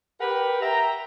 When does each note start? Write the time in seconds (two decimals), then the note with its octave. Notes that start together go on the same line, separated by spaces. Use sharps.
0.21 G4 A#4 B4 F#5 G5
0.62 A#4 E5 G5 A#5